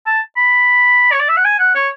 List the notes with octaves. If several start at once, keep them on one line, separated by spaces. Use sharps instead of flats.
A5
B5
C#5
D5
E5
F#5
G#5
F#5
C#5